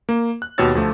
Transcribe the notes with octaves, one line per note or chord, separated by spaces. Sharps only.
A#3
F#6
D#2 B2 G4 C#5 E6 A6
D2 F3 A3